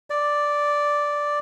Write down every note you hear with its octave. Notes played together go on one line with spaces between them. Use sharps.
D5